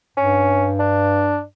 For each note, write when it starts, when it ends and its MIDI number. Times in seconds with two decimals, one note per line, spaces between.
0.17 1.46 43
0.17 0.69 61
0.79 1.39 62